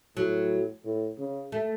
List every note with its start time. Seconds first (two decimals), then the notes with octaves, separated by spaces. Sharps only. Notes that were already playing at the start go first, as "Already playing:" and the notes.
0.16 A2 F#3
0.84 A2
1.18 C#3
1.52 A3